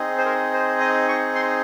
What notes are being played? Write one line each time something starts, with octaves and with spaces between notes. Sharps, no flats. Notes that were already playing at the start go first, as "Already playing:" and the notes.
Already playing: C4 D#4 G#4
C5
A#4
C5
D#5
C#6
C6